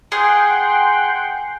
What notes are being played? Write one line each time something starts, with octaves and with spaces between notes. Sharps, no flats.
G#4 F#5 G5 C6